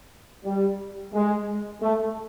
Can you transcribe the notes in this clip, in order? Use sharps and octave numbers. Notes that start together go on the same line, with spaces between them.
G3
G#3
A3